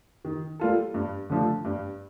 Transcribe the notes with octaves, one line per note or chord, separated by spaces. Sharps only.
D#3
G3 A#3 F4 A4
G2
D3 F3 A3
G2